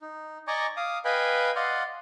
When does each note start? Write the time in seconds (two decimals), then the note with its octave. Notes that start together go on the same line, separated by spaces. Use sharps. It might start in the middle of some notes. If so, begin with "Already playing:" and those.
0.01 D#4
0.47 D5 D#5 G#5 A#5 C#6 D6
0.77 F5 D6 D#6
1.05 B4 D#5 F5 G5 G#5 B5
1.55 D5 D#5 F5 F#5 C6